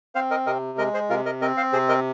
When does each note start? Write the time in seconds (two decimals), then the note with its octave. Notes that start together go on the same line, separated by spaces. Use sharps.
0.15 C4 C5 F5
0.31 A#4 D#5
0.47 C3 A#4 D#5
0.78 G#3 A#4 D#5
0.94 G#4 C5
1.10 C3 F4 A#4
1.26 A#4 D#5
1.41 C4 A#4 D#5
1.57 C5 F5
1.73 C3 G#4 C5
1.89 A#4 D#5